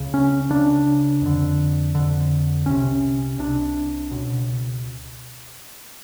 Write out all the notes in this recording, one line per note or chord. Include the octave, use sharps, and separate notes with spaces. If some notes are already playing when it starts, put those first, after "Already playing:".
Already playing: C#2 C#3
C#4
C#2 C#3 D4
F2 D3
F2 D3
C2 C3 C#4
C2 C3 D4
C#2 B2